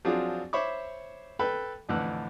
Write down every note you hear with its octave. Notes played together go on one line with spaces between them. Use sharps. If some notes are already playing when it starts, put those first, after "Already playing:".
F3 F#3 C4 D4 F4 G#4
C5 C#5 E5 B5 C#6 D6
A4 B4 G5 B5
F2 A2 D3 E3 E6 F#6